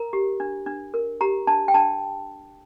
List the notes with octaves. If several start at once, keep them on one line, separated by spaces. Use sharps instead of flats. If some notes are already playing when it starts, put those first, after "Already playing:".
Already playing: A#4 A#5
G4
D4
D4
A#4
G4 A#5
D4 A5
G5
D4 A5